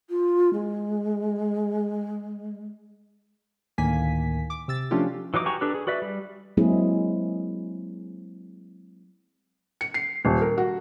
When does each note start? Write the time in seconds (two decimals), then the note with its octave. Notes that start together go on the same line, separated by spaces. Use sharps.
0.10 F4
0.53 G#3
3.78 D2 A2 D#3 A#3 G#5 B6
4.50 D6
4.68 C3 E6 A6
4.91 F3 A3 C#4 D4 F4 G4
5.34 E3 F#3 D#4 D6
5.46 F#4 G4 G#5 A#5 C#6
5.61 D4 G4 A4 B4
5.74 G#4
5.87 F#4 B4 D5 E5
6.02 G3
6.57 F#3 G#3 A#3 C4 E4 G#4
9.81 C#7
9.94 C7
10.25 D#1
10.41 A#4
10.58 F#4